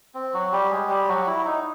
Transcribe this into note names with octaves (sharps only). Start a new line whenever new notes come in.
C4
F#3 F#4
G3 G4
G#3 G#4
G3 G4
F#3 F#4
E4
D#4